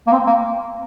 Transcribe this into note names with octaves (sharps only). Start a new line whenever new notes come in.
A#3
C4
A#3